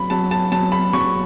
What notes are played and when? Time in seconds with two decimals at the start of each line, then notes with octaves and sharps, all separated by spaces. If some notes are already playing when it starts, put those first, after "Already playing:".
Already playing: F#3 B5
0.10 F#3 A5
0.31 A5
0.52 F#3 A5
0.72 B5
0.93 F#3 C#6